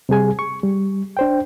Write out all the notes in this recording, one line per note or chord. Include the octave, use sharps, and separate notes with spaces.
C3 G3 G#4 G#5
C#6
G3
D4 C5 G5